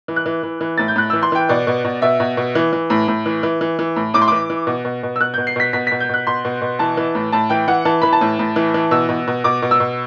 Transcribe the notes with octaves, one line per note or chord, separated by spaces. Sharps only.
E3
F#6
E3
E3
E3
A2 A6
G6
A2 F#6
E3 E6
C6
E3 G5
B2 D5
B2
B2
B2 E5
B2
B2
E3
E3
A2
A2
E3
E3
E3
E3
A2
A2 D6
C6
E3 D6
E3
B2
B2
B2
E6
B2 F#6
B2 G6
C7
B2 B6
B2 B6
B2 B6
G6
B2 F#6
B2 C6
B2
B2
E3 A5
E3
A2
A2 A5
E3 G5
E3 F#5
E3 A5
E3 B5
A5
A2
A2
E3
E3
B2 E6
B2
B2
B2 D6
B2
E6
B2